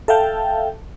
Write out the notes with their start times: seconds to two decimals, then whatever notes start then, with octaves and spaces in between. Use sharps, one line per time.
0.08 A4 E5 F5 G5 A5